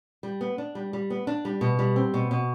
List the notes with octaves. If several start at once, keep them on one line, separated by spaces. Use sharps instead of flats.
G3
B3
D4
G3
G3
B3
D4
G3
B2
G3
C4
B2
B2